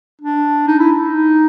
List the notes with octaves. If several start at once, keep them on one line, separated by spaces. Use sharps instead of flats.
D4
D#4
E4
D#4